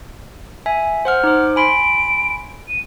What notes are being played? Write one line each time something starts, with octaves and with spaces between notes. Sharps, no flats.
E5 G#5
C5 F#5 F6
D#4 C5 D6
G#5 B5 C6 D7
D#7